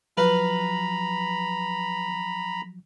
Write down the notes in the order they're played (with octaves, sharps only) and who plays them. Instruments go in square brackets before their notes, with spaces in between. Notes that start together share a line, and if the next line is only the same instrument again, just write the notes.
[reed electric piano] F3 F#3 [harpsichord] B4 F5 [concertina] A#5 B5